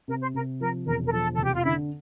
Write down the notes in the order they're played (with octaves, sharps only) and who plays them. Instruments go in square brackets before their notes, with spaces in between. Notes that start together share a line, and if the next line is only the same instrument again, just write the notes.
[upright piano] C3 [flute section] A#4
[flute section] C5
[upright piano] C3 [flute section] A#4
[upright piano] F3 [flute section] A#4
[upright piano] E1 [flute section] A#4
[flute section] A#4
[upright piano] F3 [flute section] A4
[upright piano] F1 [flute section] A4
[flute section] G4
F4
[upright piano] D3 [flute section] E4